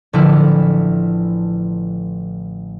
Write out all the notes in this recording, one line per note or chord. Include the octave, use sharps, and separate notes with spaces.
A1 D3 F3 E4 F6